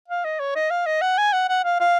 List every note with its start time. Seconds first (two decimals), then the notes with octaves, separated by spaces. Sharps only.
0.08 F5
0.24 D#5
0.40 C#5
0.56 D#5
0.71 F5
0.86 D#5
1.01 F#5
1.18 G#5
1.33 F#5
1.49 F#5
1.64 F5
1.80 F5